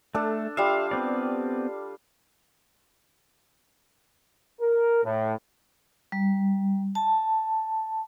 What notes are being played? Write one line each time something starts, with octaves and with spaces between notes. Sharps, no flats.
A3 D4 A4
G3 F4 E5 F5
B3 C4 D5
A#4
A2
G3
A5